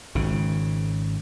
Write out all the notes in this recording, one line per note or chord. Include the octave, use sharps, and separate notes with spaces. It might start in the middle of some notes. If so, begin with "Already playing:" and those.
G#1 C#3